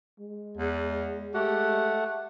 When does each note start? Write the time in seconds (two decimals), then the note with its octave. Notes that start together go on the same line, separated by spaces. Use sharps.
0.20 G#3
0.57 E2
1.34 A3 G4 F#5